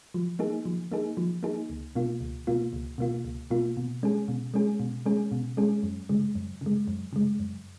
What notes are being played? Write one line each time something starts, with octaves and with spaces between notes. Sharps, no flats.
F3
A#3 D#4 G#4
F3
A#3 D#4 G#4
F3
A#3 D#4 G#4
C#2
B2 A#3 F4
C#2
B2 A#3 F4
C#2
B2 A#3 F4
C#2
B2 A#3 F4
B2
G#3 C#4 G#4
B2
G#3 C#4 G#4
B2
G#3 C#4 G#4
B2
G#3 C#4 G#4
F#2
C#3 G#3
F#2
C#3 G#3
F#2
C#3 G#3
F#2